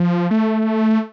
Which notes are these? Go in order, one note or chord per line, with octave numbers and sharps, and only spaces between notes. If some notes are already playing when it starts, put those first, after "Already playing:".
Already playing: F3
A3